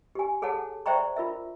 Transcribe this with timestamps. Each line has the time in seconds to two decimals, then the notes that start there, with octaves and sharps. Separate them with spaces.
0.15 G4 G#5
0.42 G#4 A4 C#5 F#5 A5
0.86 C5 D5 E5 G5 A#5 C#6
1.16 F4 A#4 E5